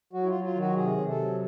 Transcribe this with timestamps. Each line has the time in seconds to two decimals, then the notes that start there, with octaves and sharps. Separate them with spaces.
0.13 F#3 F#4
0.23 E4
0.28 F4
0.35 F#3
0.44 F4
0.55 D#3
0.60 F#4
0.76 C3 G#4
0.97 C3
1.08 A4
1.19 F#3